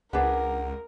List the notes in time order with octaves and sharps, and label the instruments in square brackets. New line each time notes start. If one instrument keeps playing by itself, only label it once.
[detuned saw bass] C#2 [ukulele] D4 G#4 B4 [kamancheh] A#4 [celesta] F#5